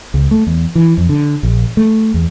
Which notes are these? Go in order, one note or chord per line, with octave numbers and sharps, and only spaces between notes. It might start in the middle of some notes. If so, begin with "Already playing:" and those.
C#2
A3
E2
E3
F2
D3
A#1
A3
E2